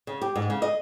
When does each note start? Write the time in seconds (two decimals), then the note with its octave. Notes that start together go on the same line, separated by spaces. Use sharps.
0.07 C#3
0.22 G4
0.36 G#2
0.50 C#3
0.62 D#5